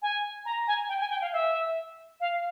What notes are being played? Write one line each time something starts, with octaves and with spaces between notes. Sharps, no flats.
G#5
A#5
G#5
G5
G#5
G5
F5
E5
F5